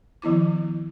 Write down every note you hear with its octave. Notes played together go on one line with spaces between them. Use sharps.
D#3 F3 B3 E4 D6